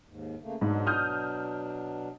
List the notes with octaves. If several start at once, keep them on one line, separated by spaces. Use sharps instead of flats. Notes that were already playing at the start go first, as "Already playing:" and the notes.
D#2 G#2
C#3 A3 A#3
G#2 B2 F#3 D4
D#6 F6 G6